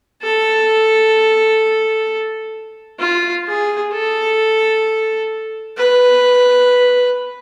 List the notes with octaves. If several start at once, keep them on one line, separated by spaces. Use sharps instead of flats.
A4
F4
G#4
A4
B4